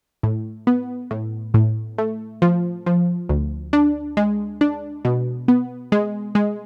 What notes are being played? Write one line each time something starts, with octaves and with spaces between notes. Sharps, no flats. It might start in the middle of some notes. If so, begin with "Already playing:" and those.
A2
B3
A2
A2
A3
F3
F3
D2
D4
G#3
D4
B2
B3
G#3
G#3